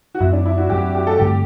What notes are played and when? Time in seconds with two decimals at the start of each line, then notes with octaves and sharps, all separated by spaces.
0.15 F#4
0.20 F#2 F#3 C4 E4
0.33 D4
0.45 E4
0.58 F#4
0.70 F#2 F#3 C4 G4
0.95 G4
1.07 A4
1.19 G2 D3 A3 C4 G4